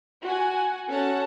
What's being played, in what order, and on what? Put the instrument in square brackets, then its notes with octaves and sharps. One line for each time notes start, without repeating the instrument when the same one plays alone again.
[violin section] F#4 F#5 G#5
C#4 F#4 A4 F#5 A5